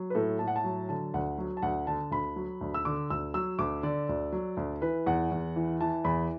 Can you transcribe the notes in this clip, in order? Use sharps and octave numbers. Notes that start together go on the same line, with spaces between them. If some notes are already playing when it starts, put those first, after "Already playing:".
Already playing: F#3
B4
A2 A4
A2 A5
F#5
A5
F#3
D3 A5
D2 F#5
F#3
A5
D2 F#5
D3 A5
D2 B5
F#3
D2
E6
D3 D6
D2 E6
F#3 E6
D2 D6
D3 D5
D2
F#3
D2
E3 B4
E2 F#5
E2
E3
E3 A5
E2 B5